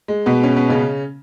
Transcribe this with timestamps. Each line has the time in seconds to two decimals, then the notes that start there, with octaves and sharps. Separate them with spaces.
0.08 G#3
0.26 B2 B3
0.43 C#4
0.56 B3
0.69 C#3 C#4